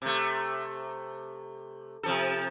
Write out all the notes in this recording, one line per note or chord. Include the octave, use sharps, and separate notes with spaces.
C3 A3
C3 F3 A4